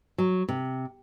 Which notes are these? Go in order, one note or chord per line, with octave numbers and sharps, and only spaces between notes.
F#3
C3